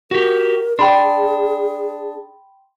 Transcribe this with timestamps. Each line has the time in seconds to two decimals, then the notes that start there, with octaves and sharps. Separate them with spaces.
0.11 F#4 G4 A#4
0.79 D4 G#4 G5 B5 C6